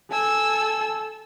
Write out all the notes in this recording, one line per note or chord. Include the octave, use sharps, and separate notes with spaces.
A4 G#5 E6